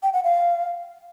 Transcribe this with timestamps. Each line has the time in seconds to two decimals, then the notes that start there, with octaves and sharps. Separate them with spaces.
0.03 G5
0.13 F#5
0.24 F5